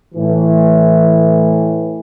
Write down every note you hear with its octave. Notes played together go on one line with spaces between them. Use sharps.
A2 E3